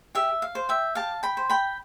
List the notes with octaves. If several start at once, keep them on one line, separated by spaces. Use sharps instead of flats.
G4 E5
F5
C5
E5 G5
G4 F5 A5
G5 B5
C5
G5 B5